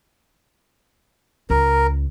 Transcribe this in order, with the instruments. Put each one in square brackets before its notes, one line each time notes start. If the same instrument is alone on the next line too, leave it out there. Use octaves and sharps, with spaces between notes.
[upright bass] C#2 [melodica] A#4